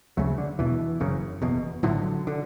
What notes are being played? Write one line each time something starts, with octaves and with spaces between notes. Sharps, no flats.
D2 C#3 F#3 A3
D3
E1 E2 B2 E3
F#1 F#2 C#3
F#1 E2 B2
A1 A2 D3 F#3
D3